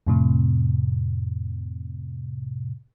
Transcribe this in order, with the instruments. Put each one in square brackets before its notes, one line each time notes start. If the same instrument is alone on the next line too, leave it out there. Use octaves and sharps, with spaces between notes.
[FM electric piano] F2 A2 C3